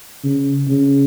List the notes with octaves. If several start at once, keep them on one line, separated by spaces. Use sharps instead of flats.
C#3
C#3